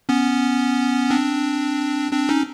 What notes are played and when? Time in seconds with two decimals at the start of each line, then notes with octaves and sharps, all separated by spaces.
0.09 B3 C#4
1.10 C4 D4
2.12 C4 D4
2.29 C#4 D#4